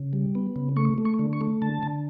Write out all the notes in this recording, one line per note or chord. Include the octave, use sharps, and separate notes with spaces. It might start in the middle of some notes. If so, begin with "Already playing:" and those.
Already playing: C#3
G3
B3
C#3
A3 C#6
A3
C#6
D3
C#6
A3
D3 A5
D3